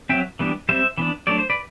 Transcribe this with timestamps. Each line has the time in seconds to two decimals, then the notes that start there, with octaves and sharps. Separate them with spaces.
0.09 F#3 C4 E5 G5
0.39 E3 G3 B3 D4
0.69 G3 C4 C5 E5
0.98 E3 B3 D4
1.27 F#3 A3 D4 D5
1.38 C5
1.50 B4 D5